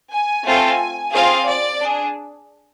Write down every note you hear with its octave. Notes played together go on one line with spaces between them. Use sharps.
G#5
A3 C4 F4 A4
C4 F4 G#4 F5
D5
D4 G#4